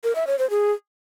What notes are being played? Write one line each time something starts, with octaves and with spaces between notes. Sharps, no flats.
A#4
E5
C#5
C5
G#4